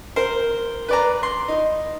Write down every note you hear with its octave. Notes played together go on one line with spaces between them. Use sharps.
A#4 C5
B4 D5 A#5
C6
D#4